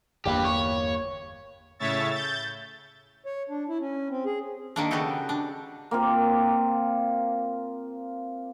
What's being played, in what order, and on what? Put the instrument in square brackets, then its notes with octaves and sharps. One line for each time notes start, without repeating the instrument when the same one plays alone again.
[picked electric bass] G1 E2 A#3 [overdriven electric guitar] G4 B4
[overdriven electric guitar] C#5
[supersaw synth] A2 C#3 C#5 E5 A6
G6 A6
[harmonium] C#5
D4
E4
C#4
C4
G#4
[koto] D#3 A#3 D4
C#3 B3 F#4 G4 A4
D4
[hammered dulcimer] A#3 C4 F4